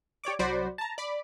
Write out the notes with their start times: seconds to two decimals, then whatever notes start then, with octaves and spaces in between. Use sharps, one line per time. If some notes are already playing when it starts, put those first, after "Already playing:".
0.24 G4 C#5 D5 D6
0.39 C2 F#3 F#4 C5 D5 B5
0.78 A5 A#5
0.98 D5 B5